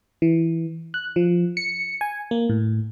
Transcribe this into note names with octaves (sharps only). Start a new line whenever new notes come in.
E3
F#6
F3
C#7
G#5
A#3
A2